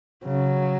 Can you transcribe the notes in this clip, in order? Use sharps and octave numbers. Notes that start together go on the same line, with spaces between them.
C#3 F#3